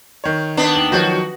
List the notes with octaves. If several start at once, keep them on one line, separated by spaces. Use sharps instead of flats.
D#3 C#5
B3 D4
D#2
D#3 F3 F#3 F#4